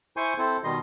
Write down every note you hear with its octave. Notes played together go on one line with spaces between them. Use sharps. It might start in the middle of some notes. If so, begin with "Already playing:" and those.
E4 C5 G#5 C6 C#6
C4 E4 A4 C5
B2 D#3 G3 D#5 C6